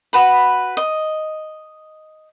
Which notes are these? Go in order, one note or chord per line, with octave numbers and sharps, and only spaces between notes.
F#4 B4 B5
D#5